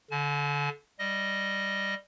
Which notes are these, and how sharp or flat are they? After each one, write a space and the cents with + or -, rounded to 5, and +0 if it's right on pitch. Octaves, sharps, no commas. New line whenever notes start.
D3 -25 G#5 +45
G3 +0 D#5 +0